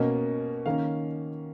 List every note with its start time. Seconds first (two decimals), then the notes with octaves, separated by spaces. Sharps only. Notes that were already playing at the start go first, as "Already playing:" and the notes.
Already playing: B2 A#3 C#4 D#5
0.66 D#3 A#3 C#4 F5